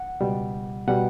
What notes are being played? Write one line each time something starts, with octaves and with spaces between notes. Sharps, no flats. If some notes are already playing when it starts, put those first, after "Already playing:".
Already playing: F#5
C#2 B2 G3
B2 G3 F#5